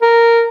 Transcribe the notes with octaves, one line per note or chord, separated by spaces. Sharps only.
A#4